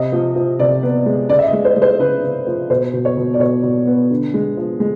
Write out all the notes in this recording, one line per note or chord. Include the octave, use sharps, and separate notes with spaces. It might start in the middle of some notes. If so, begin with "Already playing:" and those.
Already playing: C3 D#5
F3
F3
C3 D5
B3
G#3
C#3 D5
E5
D#5
G#3
C5
G#3
C5
C#3 B4
C#3
F3
B2 C5
B2
C#5
B2
D5
B2 C#5
B2
B3
D3
G#3
F3
G#3